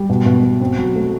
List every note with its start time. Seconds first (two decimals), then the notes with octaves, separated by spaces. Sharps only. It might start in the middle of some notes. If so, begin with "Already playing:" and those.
Already playing: G3
0.10 B2
0.26 B2
0.43 B2
0.61 C4
0.78 F#3
0.96 A3